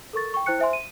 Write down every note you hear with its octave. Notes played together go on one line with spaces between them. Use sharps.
A4 A#4 C#6 A6
G5 C#6
E4 C5 G5 F#6 C#7
C5 E5 G#5 C6
D#7